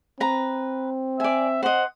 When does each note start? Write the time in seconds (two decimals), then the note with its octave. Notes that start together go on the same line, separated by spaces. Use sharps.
0.20 C4 B4 A#5
1.20 D5 E5 G#5
1.63 C5 D#5 F#5